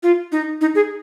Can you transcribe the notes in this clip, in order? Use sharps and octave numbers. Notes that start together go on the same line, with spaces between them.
F4
D#4
D#4
G#4